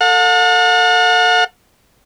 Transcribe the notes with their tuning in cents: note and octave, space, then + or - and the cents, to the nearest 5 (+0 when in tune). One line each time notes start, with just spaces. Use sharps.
A4 +25 F#5 -45